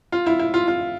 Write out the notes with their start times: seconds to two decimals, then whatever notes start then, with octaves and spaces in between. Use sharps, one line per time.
0.12 F4
0.27 E4
0.39 E4
0.54 F4
0.68 F4